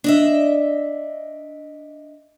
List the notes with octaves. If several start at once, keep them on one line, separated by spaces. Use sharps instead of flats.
D4 D#5 E5